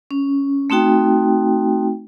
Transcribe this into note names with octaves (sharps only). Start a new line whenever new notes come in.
C#4
A3 C4 D#4 F#4 G5